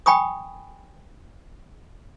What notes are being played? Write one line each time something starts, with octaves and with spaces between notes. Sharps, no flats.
G5 G#5 B5 C#6 D#6